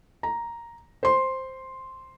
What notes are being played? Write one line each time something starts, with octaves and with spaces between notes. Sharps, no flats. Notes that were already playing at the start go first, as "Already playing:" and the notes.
A#5
C5 C6